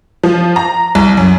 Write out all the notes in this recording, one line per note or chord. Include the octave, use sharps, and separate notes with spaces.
F3
A#5
C2
F#2